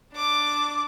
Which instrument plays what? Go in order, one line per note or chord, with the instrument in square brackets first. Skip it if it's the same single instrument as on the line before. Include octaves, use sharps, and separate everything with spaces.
[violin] D4 D6